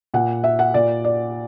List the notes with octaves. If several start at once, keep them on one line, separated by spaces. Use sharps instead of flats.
A#2 F#5
E5
F#5
A#2 D5
D5